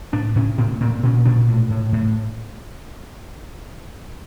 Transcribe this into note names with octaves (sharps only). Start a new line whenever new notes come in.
A2 D4
A2 C#4
A2 C4
A#2 C4
A#2 C#4
A#2 D4
A2
A2
A2